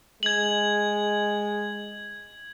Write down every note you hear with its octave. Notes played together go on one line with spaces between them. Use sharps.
G#3 G#6 F#7